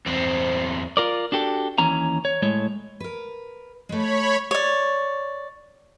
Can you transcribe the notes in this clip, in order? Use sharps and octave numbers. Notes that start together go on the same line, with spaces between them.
E2 C4
F4 A#4 D5
D4 F#4 G4 A4
D#2 E3 C#4 A#5
C#5
A2 G#3 C#5
A#4 B4
G#3 A3 C#5 B5
C#5 D5